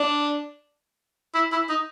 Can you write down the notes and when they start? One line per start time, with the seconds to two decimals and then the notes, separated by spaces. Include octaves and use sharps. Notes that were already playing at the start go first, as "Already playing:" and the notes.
Already playing: D4
1.35 E4
1.52 E4
1.69 D#4